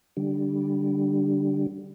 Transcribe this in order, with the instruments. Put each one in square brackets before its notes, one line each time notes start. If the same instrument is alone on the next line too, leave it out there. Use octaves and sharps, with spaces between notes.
[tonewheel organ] D3 G3